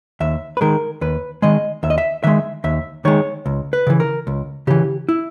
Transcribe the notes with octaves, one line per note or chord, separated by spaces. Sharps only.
D#2 E5
B4
D#3 G#3 A#4
D#2 B4
D#3 G#3 D#5
D#2 E5
D#5
E5
D#3 G#3 E5
D#2 E5
D#3 G#3 C#5
C#2
B4
C#3 E3
A#4
C#2
C#3 E3 G4
E4